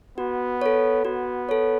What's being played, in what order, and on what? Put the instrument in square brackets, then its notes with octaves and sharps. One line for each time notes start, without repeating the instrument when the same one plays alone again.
[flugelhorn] B3 [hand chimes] F#4
[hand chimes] A4 C#5
[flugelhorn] B3 [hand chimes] F#4
[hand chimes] A4 C#5